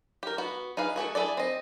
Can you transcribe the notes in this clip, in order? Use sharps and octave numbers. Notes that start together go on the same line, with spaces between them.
G4 A#4
B3 F#4
D#4 G#4 B4 F5
A3 B3 F#4 G#4
E4 G#4 A4 D5
C4 D#5